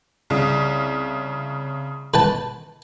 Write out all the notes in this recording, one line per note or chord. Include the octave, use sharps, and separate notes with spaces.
C2 C#3
B4 G5 A5